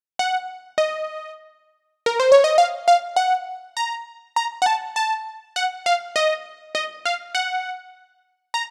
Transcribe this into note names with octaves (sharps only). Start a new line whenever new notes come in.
F#5
D#5
A#4
C5
C#5
D#5
F5
F5
F#5
A#5
A#5
F#5
A5
A5
F#5
F5
D#5
D#5
F5
F#5
A#5